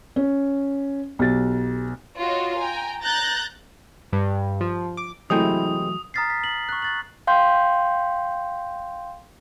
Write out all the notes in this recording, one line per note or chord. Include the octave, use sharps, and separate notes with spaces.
C#4
B1 G4 A6
F4 F#4 C#5 D#5
G5 G#5 A#5
A#5 F#6 G6 A6 A#6
G2
F3
D6
C3 E3 F#3 G#3 A3 E4 G5 D#6
A#5 D#6 F6 A6 B6 C7
B6
B6 F#7
C#6 F#6
F#6 A6 F#7
F5 G5 C6 G6